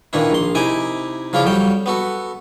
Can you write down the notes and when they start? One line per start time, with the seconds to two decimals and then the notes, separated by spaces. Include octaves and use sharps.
0.13 A#2 D#3 E3 D4 E4
0.31 A#1 C6
0.55 C3 D#4 E4 G#5 D6
1.33 C#3 F3 E4 F4 D5
1.44 F2 F#3 G3 G5
1.86 B3 F#4 A4